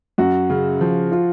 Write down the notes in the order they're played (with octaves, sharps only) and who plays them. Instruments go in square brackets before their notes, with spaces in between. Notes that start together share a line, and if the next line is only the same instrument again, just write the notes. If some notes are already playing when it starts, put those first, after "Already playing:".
[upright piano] F#2 [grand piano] F#4
[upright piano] C#3
F3
[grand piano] F4